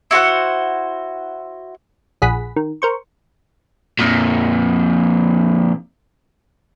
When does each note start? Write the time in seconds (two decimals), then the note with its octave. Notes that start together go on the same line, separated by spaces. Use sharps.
0.11 E4 F#4 C5 F#5
2.22 A#1 G#4 F#5 B5 B6
2.56 D#3
2.82 A#4 C5 C#6
3.99 F2 A#2